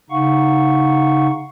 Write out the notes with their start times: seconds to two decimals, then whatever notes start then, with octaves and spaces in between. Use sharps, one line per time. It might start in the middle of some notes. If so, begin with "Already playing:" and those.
0.10 C#3 D#4 F5 F#5 C#6